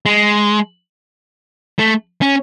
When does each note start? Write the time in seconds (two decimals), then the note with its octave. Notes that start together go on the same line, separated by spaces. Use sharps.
0.06 G#3
1.79 A3
2.22 C#4